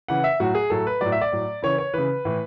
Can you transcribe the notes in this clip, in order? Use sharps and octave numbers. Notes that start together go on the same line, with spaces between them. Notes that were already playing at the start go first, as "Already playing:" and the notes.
C#3 E3 F#5
E5
A2 F#3 F#4
G#4
A2 F#3 A4
B4
A2 F#3 D5
E5
D5
A2 F#3
C#3 E3 C#5
C#5
C#3 E3 B4
A2 E3